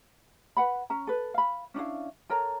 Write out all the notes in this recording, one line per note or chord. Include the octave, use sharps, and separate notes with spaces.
B4 F#5 B5
C#4 A#5
A4 B4
F5 B5
C#4 D4 E4 F5
A4 A#4 C#5 A#5